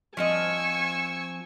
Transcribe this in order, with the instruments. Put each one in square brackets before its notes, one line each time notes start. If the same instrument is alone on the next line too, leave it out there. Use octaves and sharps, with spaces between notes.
[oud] F3 C4 D#5 [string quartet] G#5 C#6 E6